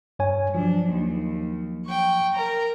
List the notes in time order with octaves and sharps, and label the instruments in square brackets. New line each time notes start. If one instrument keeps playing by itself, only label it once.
[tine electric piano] G2 C#5 G#5
[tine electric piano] F3 F#3 [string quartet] D4
[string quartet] D#2
G5 C#6
A#4 A#5